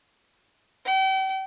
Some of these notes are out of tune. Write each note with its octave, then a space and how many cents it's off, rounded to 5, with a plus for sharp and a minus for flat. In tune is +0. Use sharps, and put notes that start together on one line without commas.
G5 -40